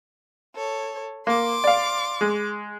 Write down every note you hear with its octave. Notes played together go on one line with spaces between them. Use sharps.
A4 C#5
A#3 C6 D6
D5 F5
G#3